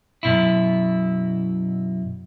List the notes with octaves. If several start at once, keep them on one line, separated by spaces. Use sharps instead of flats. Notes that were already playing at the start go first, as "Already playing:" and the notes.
F#2 B2 E4